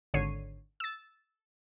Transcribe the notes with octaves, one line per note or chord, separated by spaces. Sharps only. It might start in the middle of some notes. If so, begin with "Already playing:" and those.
G#1 D3 C#5 C7 D#7
E6 A6